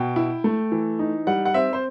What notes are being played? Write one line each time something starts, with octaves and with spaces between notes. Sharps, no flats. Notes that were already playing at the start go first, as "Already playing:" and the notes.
Already playing: B2 G5
E4
A3
E3
D#4
G3 F#5
F#5
C4 E5
C5